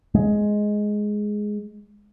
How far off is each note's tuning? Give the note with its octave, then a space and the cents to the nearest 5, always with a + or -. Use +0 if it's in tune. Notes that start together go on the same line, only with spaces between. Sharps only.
G#3 +5